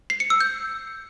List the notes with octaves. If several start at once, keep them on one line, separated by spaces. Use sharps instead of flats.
C7
C#7
E6
G6